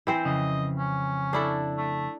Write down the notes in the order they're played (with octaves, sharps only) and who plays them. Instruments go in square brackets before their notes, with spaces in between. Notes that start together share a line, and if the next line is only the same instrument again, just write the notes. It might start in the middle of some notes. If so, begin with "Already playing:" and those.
[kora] E3 C4 C5
[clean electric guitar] F2 C#3 [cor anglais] D#5
[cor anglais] C#4
[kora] D4 E4 A4
[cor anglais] A3